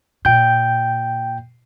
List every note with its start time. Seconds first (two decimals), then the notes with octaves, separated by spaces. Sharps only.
0.25 A#2 G5 G6